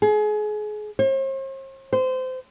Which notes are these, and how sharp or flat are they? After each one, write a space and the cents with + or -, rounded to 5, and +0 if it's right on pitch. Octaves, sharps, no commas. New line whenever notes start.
G#4 +30
C5 +45
C5 -25